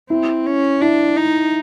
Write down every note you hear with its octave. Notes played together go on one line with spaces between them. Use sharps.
C4 E4
C#4
D4 E4
D#4